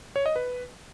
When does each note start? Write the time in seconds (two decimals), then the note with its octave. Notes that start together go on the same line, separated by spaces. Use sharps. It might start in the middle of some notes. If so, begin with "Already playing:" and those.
0.16 C#5
0.26 D#5
0.36 B4